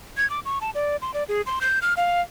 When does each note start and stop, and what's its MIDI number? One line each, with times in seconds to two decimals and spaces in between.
0.17 0.29 92
0.30 0.40 86
0.45 0.59 85
0.61 0.71 81
0.75 0.97 74
1.02 1.14 84
1.14 1.24 74
1.29 1.42 68
1.46 1.59 84
1.61 1.79 91
1.82 1.94 89
1.97 2.21 77